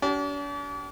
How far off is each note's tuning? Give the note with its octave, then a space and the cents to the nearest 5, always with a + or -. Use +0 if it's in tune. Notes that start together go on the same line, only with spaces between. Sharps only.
D4 -45 G4 -40